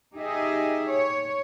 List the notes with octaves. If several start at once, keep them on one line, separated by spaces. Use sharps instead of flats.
D#4 G4 G#4 D#5 E5
C#5